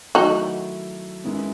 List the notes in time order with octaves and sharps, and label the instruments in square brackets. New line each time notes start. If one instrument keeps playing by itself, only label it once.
[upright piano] D#3 F#3 A3 E4 [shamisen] D#4 F#4
[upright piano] F#2 D#3 G#3 B3 E4